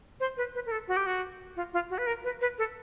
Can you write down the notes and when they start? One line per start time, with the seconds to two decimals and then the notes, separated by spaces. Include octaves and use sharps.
0.20 C5
0.37 B4
0.55 B4
0.66 A#4
0.71 A4
0.88 F#4
0.97 G4
1.06 F#4
1.56 F4
1.73 F4
1.90 F#4
1.98 B4
2.07 A#4
2.24 B4
2.41 B4
2.58 A4